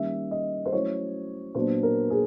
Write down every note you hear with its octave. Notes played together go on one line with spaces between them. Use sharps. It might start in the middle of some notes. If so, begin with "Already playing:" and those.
Already playing: D#3 G3 A#3 C#4 E5
D#5
C5
F#3 A3 C#4 E4 C#5
A#2 F#3 B3 D4 C5
A#4
G#4